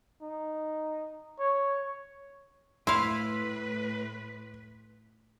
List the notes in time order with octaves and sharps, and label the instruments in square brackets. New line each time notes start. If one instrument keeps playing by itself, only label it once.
[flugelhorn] D#4
C#5
[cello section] A2 B4 [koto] E4 F5 [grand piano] C6